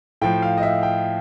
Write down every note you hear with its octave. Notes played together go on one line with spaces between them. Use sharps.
A2 F3 G5
F5
D#5
E5
G5